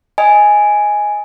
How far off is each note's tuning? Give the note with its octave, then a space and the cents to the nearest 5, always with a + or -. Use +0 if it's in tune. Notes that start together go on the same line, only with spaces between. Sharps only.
D#5 +15 G#5 +0